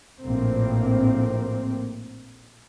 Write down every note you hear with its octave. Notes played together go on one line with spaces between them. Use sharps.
A#1 A2 A#3 C4